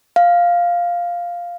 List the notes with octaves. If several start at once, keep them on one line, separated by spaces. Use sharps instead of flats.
F5